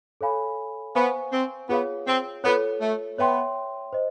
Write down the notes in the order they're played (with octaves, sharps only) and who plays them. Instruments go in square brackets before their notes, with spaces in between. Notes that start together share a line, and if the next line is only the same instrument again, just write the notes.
[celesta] A4 C#5 F5 G#5 B5
[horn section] B3 [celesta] C5 F5 G#5 C#6
[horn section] C4
[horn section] B3 [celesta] F4 G#4 C#5 F5
[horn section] C4
[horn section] B3 [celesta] F4 A4 C#5
[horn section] A3
[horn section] B3 [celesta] C#5 E5 G5 C6
[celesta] C5 D#5